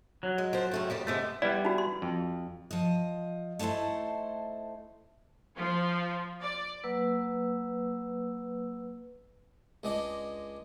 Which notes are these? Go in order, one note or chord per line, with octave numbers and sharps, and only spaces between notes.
F#3
G#3
F3 C5
C#3 A3 C4
F2 G3 C4
C3 G#3 A3 B3
G3 B3 E4 D5
D#4 F#4
C6
F2
F3 D#5
A3 D#4 E4 C5 A5
F3
D5
F#3 A#3 B4 E6
C#2 G#3 D4 D#5